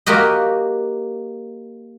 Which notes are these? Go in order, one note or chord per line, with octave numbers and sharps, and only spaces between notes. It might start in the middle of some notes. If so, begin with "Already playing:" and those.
A#3 F#4 G4 D#5